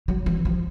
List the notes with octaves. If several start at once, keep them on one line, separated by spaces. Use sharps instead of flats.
F#3
E3
F3